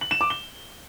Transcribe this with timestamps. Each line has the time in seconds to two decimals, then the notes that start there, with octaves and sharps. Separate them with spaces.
0.01 F#7
0.11 E7
0.21 D6
0.30 G7